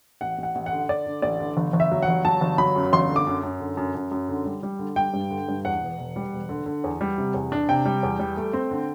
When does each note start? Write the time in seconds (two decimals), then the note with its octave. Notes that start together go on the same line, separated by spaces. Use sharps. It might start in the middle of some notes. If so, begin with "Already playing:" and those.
0.21 A1 F#5
0.38 A1
0.43 F#5
0.55 A1
0.66 F#5
0.71 D3
0.89 D3 D5
1.07 D3
1.22 A1 D5
1.40 D3
1.57 G1
1.73 G1
1.80 E5
1.91 F#3
2.03 F#5
2.08 G1
2.25 F#3 A5
2.41 G1
2.58 F#3 B5
2.76 F#2
2.93 G1 C6
3.09 D3
3.16 D6
3.27 F#2
3.43 F#2
3.60 D3
3.77 F#2
3.95 F#2
4.11 F#2
4.29 D3
4.45 G3
4.63 G3
4.79 D3
4.96 G3 G5
5.13 G2
5.31 D3
5.48 G2
5.65 E2 F#5
5.81 E1
5.98 E1
6.16 G3
6.33 E1
6.49 D3
6.66 D3
6.84 E2
7.01 G3
7.18 C3
7.34 E2
7.52 D4
7.69 C3 G5
7.85 G3
8.03 E2
8.19 G3
8.37 A3
8.53 C4
8.71 D3